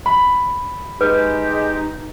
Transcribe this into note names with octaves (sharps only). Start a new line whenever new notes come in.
B5
G#3 D#4 G4 B4